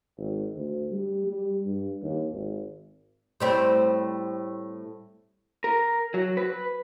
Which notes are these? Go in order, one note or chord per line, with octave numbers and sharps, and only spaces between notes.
G#1
D2
G3
G3
G2
D#2
G#1
A2 G3 C4
A#4
F#3
B4